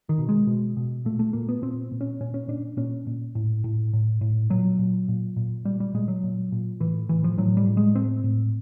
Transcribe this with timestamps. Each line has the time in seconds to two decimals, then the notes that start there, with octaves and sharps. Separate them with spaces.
0.09 D#3
0.19 B2
0.29 G#3
0.47 B2
0.77 B2
1.05 A#2 A3
1.19 A3
1.33 A#2 A#3
1.49 B3
1.62 A#2 C4
1.91 A#2
2.01 C#4
2.21 A#2 C#4
2.34 C#4
2.48 A#2 D4
2.77 A#2 C#4
3.07 A#2
3.35 A2
3.64 A2
3.93 A2
4.21 A2
4.50 A#2 F#3
4.79 A#2
5.08 A#2
5.36 A#2
5.65 A#2 G3
5.80 G3
5.94 A#2 G#3
6.08 F#3
6.23 A#2
6.52 A#2
6.80 A2 E3
7.09 A2 E3
7.24 F3
7.38 A2 F#3
7.57 G3
7.67 A2
7.77 G#3
7.95 A2 C4
8.24 A2